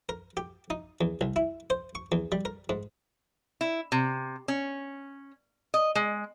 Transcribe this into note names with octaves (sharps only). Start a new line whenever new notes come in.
A#4
G4
D#4
E2
C2
E4
C5
C#6
E2
G3
A#4
G#2
E4
C3
C#4
D#5
G#3